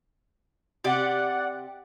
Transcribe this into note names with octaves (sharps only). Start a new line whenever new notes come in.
C3 G4 D5 F#5